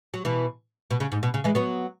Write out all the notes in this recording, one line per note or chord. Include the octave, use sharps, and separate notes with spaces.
F#3
B2 E3
B2
C#3
G#2
B2
C#3
E3 G#3
F#3 B3